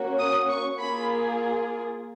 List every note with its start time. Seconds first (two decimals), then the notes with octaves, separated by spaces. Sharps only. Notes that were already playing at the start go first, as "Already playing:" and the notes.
Already playing: A#3 C#4 F#4
0.19 D#6
0.49 C#6
0.80 A#3 F4 G#4 B5